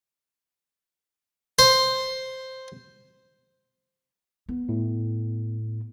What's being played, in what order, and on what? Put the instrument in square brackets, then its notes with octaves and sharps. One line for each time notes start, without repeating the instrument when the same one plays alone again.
[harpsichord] C5
[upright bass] B3
[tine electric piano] A2